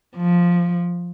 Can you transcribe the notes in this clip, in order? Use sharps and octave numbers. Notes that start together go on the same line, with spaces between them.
F3